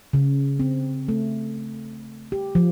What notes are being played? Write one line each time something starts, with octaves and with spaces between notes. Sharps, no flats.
C#3
C4
A3
G4
F3